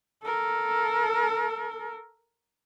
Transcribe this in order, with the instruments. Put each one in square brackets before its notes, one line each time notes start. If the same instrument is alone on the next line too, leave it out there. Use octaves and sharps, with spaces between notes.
[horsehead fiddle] A4 A#4